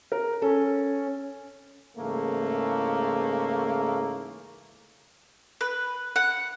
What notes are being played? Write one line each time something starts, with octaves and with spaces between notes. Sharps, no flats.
A#4
C#4 A4
G#2 C#3 E3 A3 A#3
B4
F#5